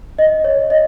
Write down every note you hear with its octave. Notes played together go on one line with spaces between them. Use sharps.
D#5
C#5
D#5